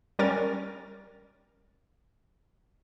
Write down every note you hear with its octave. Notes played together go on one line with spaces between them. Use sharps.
G3 C#4 A#4 A6